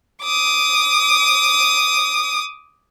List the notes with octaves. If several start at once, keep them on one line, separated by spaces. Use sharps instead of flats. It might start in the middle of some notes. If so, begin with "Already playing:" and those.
D6 D#6